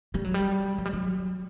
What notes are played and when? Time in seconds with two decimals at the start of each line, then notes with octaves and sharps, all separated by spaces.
0.14 G3
0.24 F#3
0.34 G3
0.78 F#3
0.86 G3
0.93 F#3